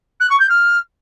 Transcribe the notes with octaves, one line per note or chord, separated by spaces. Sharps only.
F#6
C#6
G6
F6